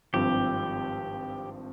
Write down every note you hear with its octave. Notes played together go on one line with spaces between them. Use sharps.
G#1 G2 F3 C4 G4